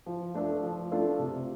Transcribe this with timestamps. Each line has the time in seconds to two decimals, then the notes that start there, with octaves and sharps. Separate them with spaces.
0.06 F3
0.34 A3 D4 F4 A4
0.63 F3
0.92 A3 D4 F4 A4
1.19 C3